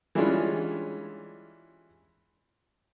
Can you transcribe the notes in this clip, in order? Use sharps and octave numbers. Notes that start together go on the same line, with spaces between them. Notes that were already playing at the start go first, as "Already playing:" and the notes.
E3 G3 G#3 C#4 D4 F4